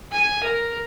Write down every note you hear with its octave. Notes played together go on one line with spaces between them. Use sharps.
G#5
A#4